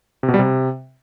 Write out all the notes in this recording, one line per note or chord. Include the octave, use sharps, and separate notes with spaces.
C3
B2
G3
C3